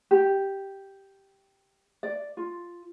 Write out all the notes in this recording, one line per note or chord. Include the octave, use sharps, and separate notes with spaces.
G4
D5
F4